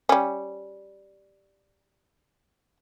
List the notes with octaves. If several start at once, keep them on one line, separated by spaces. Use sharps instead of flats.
G3 C#4